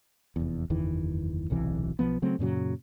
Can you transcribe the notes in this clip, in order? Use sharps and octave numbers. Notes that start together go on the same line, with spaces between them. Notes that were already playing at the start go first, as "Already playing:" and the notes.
F1 E2
F#1 E2 D#3 E3
D1 B1 C3 E3
B1 F3 B3
C#3 F#3 A3 C4
F#2 A#2 C#3 F#3